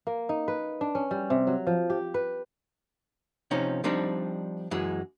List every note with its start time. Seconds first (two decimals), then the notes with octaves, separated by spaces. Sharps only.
0.07 A#3
0.29 D#4
0.48 B4
0.81 D4
0.95 C#4
1.11 G3
1.30 C3
1.47 F#3
1.67 F3
1.90 G4
2.14 B4
3.51 C3 F3 C#4 D#4
3.84 F3 G3 C4 D4 D#4
4.71 F#2 E3 G#3